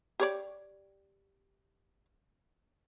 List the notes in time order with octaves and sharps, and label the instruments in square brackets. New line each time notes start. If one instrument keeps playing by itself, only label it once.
[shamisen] G4 C#5 D5